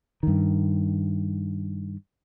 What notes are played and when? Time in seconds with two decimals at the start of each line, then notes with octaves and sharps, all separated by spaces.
0.23 G2 D#3